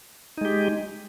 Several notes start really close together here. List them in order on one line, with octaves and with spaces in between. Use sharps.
D#4 G#3 G4